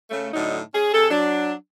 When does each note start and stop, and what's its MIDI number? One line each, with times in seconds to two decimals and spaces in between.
0.11 0.29 49
0.11 0.29 57
0.33 0.60 45
0.33 0.60 50
0.33 0.60 54
0.33 0.60 63
0.74 0.90 61
0.74 0.90 68
0.93 1.08 48
0.93 1.08 68
0.93 1.08 69
1.10 1.52 54
1.10 1.52 62